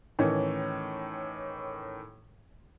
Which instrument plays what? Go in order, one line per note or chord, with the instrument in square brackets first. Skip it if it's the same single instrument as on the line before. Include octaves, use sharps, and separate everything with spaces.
[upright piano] A2 D#3 E3 C#4